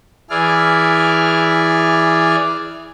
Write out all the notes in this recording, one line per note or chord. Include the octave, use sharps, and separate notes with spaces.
E3 E4 G#4 D5 F6